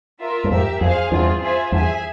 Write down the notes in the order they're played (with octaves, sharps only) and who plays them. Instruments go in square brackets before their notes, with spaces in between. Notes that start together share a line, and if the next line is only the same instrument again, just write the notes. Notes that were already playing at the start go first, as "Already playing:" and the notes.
[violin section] F4 A#4 E5
[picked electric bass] G2
[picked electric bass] F2 G#2 [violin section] G4 A#4 E5
[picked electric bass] F2 [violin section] G#4 C5 F5 G#5
[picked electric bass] E2 G2 [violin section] C4 F4 G#4
[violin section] F4 G#4 C5 E5 G#5
[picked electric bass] E2 G2 [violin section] G#4 E5 G#5